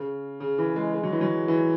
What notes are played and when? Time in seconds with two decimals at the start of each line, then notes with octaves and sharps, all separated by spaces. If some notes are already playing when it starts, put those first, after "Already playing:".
Already playing: C#3
0.40 C#3
0.58 E3
0.76 G#3
0.94 G#3
1.03 F#3
1.13 E3
1.21 F#3
1.48 E3